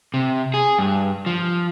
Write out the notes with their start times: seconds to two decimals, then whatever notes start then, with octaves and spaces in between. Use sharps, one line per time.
0.14 C3
0.54 G#4
0.79 G2
1.26 F3